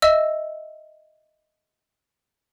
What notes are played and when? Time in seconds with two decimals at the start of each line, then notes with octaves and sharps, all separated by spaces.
0.02 D#5 E5 E6